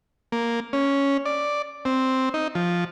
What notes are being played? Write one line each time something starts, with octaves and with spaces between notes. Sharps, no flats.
A#3
C#4
D5
C4
D#4
F3